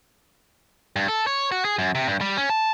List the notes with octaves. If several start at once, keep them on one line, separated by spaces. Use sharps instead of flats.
G2
A4
C#5
F#4
G#4
F#2
C3
G2
G3
C#4
A5